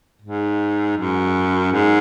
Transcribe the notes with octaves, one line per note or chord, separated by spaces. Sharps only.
G#2
F#2
G#2